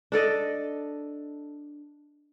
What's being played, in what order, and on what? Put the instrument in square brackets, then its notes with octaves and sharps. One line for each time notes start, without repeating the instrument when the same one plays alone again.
[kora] D4 A4 D5 D#5